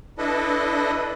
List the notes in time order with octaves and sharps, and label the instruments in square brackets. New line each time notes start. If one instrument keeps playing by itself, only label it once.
[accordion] D4 E4 A4 B4 D#5